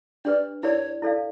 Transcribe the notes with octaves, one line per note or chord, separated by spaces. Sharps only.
D4 G4 B4 D5
E4 G4 A#4 C#5 D5
E4 A4 D5 F5